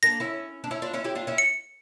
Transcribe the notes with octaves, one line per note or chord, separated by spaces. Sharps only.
A#3 D4 A#6
C#4 E4
D4
C#4 E4
D4 F4
C#4 E4
E4 G4
D4 F4
C#4 E4
C#7